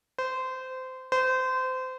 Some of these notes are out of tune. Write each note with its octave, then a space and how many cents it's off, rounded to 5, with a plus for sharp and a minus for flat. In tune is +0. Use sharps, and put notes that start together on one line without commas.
C5 -20
C5 -25